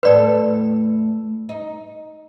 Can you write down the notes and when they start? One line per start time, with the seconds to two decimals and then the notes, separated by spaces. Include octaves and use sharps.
0.03 E2 A2 A4 B4 D5
1.49 D#4